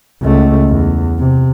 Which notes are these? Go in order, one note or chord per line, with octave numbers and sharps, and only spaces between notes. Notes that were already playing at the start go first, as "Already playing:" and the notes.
C#2 A3
E2
C3